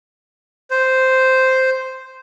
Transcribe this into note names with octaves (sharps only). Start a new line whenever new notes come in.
C5